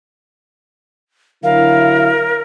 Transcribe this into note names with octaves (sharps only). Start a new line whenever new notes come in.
D3 F#3 E4 A#4 F5